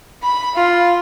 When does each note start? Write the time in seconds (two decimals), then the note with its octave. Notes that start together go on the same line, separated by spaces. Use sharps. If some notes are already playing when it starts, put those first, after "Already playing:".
0.23 B5
0.55 F4